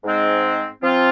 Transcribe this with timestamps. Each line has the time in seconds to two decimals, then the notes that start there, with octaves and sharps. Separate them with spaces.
0.03 G#2 G#3 C4
0.83 F3 C4 F4